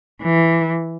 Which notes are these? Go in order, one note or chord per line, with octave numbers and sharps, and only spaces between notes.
E3